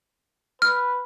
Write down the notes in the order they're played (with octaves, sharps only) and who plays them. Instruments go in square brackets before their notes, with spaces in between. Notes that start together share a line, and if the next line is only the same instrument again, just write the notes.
[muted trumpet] B4 [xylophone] F6